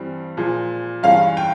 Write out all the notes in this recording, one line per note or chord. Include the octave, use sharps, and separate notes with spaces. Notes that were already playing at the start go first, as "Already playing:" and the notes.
Already playing: G2 E3 G3 C4
A#2 F3 G#3
G2 E3 G#3 C#4 F5
G5